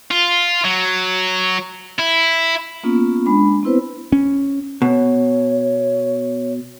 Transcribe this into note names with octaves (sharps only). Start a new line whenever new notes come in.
F4
F#3
E4
A#3 B3 C#4 F4
G#3 D4 B5
B3 C4 E4 B4 C5
C#4
B2 C#5